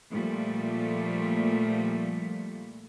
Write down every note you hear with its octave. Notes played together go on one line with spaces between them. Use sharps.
A#2 F3 G3 A3